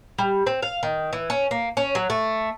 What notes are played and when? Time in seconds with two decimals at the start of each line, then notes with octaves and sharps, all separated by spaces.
0.18 G3
0.46 C4
0.62 F5
0.83 D#3
1.13 E3
1.30 C#4
1.51 A#3
1.77 C#4
1.95 F#3
2.10 A3